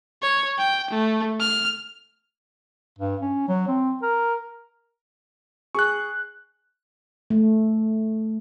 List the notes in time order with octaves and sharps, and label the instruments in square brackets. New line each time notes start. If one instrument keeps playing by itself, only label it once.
[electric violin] C#5
G5
A3
F6
[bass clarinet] G2
C#4
F#3
C4
A#4
[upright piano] G#4 [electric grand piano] C#6 F#6
[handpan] A3